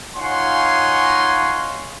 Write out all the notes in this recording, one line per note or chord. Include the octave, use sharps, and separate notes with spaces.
D#4 F4 C#5 F#5 G#5 C6